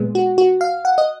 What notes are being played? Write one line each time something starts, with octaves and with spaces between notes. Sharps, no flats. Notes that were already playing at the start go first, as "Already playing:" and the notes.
Already playing: A#2 G#3 B3
F#4
F#4
F5
F#5
D#5